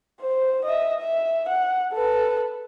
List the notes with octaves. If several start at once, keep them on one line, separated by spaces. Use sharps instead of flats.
C5
D#5 E5
E5
F#5
A4 B4